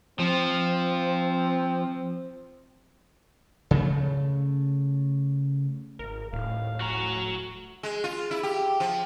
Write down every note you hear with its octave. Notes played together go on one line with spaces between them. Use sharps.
F3 C4
C#3 A3
G#1 A#4
D#1 A2 F5
C#4 F#4 A#5
G#3
F4
E4
G4
F3